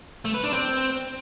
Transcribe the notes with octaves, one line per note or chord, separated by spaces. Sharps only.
A3
B4
D4
C4